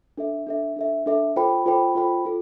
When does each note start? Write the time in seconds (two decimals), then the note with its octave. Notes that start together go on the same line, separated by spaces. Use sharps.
0.18 D4 A4 E5
0.47 D4 A4 E5
0.76 D4 A4 E5
1.06 D4 A4 E5
1.36 F4 A4 C5 G5 B5
1.66 F4 A4 C5 G5 B5
1.95 F4 A4 C5 G5 B5
2.25 F4 A4